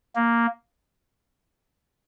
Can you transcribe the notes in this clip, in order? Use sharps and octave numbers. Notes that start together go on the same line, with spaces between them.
A#3